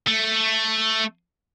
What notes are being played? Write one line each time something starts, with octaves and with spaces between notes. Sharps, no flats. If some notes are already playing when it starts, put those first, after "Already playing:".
A3